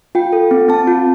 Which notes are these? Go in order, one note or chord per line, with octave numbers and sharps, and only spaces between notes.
F4 G5
A4
C4
C4 A5
F4